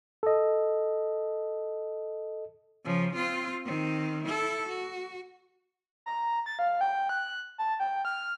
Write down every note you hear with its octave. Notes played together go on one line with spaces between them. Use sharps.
A4 D#5
C#3 F3
C4 F4
D#3 C4
E4 A4
F#4
A#5
A6
F5
G5
F#6
A5
G5
F6